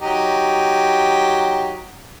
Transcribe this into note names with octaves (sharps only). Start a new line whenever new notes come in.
F#3 D#4 G4